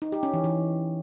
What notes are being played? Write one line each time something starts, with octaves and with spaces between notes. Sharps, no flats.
D#4
G4
C#4
E3
E3